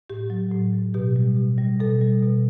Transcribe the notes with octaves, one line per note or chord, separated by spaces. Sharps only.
A2 G4
F#3
A2
F#3
B2 G4
G3
B2
G3
B2 A4
G3
B2